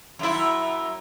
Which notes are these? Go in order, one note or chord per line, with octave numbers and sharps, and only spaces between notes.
F#2 E4